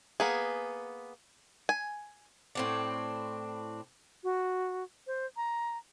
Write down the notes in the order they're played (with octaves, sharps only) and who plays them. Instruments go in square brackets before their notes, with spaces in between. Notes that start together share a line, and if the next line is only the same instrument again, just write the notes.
[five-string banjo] A#3 B3 G#4
G#5
[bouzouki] A2 C4 D4
[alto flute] F#4
C5
A#5